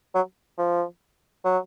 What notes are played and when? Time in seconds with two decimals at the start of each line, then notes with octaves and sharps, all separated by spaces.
0.15 F#3
0.58 F3
1.45 F#3